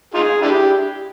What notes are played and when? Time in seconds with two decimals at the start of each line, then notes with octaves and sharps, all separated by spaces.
0.14 D#4 F4 G#4
0.42 D4 E4 G4